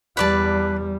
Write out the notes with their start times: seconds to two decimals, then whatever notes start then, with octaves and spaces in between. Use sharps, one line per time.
0.17 E2 G3 B4 D5 A5